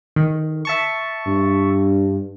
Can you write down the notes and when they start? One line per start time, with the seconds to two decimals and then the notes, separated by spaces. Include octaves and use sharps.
0.16 D#3
0.65 E5 A5 C#6
1.26 G2